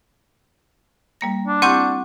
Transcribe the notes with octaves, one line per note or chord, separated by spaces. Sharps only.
G3 A#3 A#6
D4
C4 E4 G4 F#5 C#6 G6